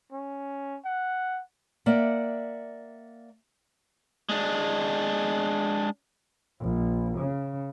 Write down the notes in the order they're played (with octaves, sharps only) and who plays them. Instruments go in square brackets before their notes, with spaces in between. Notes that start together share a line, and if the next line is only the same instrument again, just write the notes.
[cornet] C#4
F#5
[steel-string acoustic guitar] A#3 D5 E5 F#5
[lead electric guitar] G#3 D4
[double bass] A#1
C#3